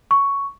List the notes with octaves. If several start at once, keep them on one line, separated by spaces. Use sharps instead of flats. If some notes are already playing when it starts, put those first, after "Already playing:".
C#6